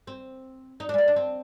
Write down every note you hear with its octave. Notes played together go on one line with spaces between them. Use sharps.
C4
D#4
D4
G#3
A#3
D4
C4